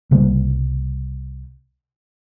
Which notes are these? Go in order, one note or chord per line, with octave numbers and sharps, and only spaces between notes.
C2 C#3 G3 A#3